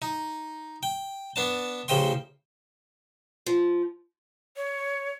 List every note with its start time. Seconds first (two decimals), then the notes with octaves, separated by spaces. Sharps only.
0.02 D#4
0.83 G5
1.36 B3 D4 A5
1.88 A1 C#3 C5 D#5 G5 C6
3.46 F3
4.56 C#5